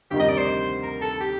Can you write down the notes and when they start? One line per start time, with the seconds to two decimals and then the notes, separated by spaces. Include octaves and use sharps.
0.11 D2 C3 D#3 G3 G4
0.20 D#5
0.29 D5
0.38 C5
0.83 A#4
1.01 A4
1.21 G4